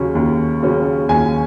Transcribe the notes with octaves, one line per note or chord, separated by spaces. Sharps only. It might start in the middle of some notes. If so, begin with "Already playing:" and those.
Already playing: D#2 C#3 F#3 C#4
D#2
C#3 F#3 C#4
D#2 G#5